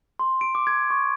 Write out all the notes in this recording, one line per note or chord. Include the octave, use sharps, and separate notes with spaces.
C6
D7
D6
G#6
C#6